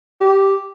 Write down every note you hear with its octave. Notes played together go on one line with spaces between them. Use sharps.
G4